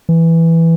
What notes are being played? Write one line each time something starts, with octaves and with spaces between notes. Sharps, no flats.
E3